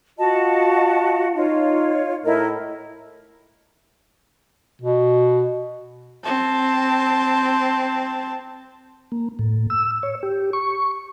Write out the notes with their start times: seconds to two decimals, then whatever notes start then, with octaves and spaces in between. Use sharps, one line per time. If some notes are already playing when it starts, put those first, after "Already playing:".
0.19 F4 F#4 D#5 A5
1.36 D#4 F4 C#5
2.25 A2 E4 A#4 D#5
4.81 B2
6.24 C4 A5
9.12 A#3
9.39 A2
9.70 E6
10.03 C#5
10.23 G4
10.53 C#6